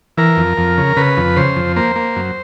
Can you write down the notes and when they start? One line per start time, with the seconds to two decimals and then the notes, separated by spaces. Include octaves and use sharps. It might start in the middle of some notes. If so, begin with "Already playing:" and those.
0.17 E3 A#4
0.37 F2
0.58 F2
0.78 C#3
0.97 C#3 B4
1.17 F2
1.36 C#3 C5
1.56 F2
1.76 A#3 C5
1.96 A#3
2.16 F#2